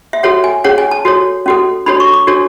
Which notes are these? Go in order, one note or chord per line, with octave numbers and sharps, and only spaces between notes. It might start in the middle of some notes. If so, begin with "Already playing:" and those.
E5
F#4 A4 C#5 F#5
G#5
C#4 G#4 C#5 F#5
G#5
A5
F#4 A4 C#5
C#4 F#4 A4
D4 F#4 A4 C#5 B5
C#6
D6
D4 F#4 A4 C#5